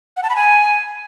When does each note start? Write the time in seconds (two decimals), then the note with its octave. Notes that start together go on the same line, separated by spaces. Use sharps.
0.17 F#5
0.23 A5
0.30 B5
0.36 G#5